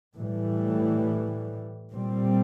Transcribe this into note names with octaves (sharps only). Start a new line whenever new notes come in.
A2 E3 G3
A#2 G3 C4